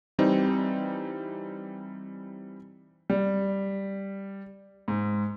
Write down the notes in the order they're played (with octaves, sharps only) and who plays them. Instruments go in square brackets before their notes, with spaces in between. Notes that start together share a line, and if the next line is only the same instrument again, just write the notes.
[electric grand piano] E3 G3 C4 D#4
[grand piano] G3
G#2